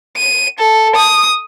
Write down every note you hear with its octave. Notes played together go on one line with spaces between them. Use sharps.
D#7
A4
D#6